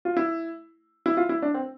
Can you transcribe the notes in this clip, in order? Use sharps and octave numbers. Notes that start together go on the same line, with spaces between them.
F4
E4
E4
F4
E4
D4
C4